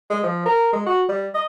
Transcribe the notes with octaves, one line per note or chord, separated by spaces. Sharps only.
G#3
F3
A#4
G#3
F#4
G3
D#5